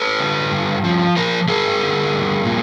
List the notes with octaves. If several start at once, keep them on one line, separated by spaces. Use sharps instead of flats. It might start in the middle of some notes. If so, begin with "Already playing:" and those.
Already playing: A4 B4
D3
G2
F3
F3 A#4 C5
G2 G#4 A#4
D3
G2
A#2